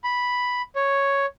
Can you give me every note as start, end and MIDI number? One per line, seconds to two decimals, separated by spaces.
0.04 0.62 83
0.76 1.26 73